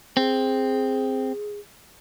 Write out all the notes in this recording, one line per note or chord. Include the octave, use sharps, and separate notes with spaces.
C4 G#4